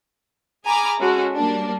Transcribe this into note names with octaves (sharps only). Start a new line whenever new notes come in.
G#4 G#5 A#5 B5 D6 F6
G#3 C#4 F#4 A4
G3 A#3 D4